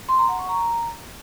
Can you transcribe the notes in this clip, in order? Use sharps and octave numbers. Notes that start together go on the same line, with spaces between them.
C6
A#5
F#5
C#6
A#5